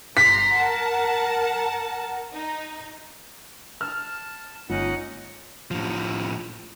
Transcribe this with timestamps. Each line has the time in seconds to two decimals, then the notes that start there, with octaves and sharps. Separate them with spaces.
0.17 G1 A#5 C6 B6
0.54 A#4 F#5 A5
2.34 D#4
3.81 A5 F6
4.70 G1 G#3 A#3 C#4 D#4 F4 F#5
5.71 A2 F3